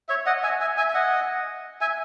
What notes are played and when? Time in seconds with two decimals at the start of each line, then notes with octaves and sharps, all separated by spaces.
0.09 C#5 E5
0.26 D#5 F#5
0.43 E5 G#5
0.61 E5 G#5
0.77 E5 G#5
0.89 E5
0.94 D#5 F#5
1.81 E5 G#5